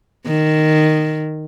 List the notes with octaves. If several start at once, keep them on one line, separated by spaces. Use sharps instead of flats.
D#3